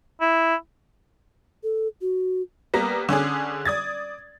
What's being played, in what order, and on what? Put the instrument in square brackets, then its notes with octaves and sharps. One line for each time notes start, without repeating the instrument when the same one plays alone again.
[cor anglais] E4
[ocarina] A4
F#4
[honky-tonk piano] G3 A#3 B3 A#5
D3 C#4 D4 G#4
D5 D#6 G#6 A6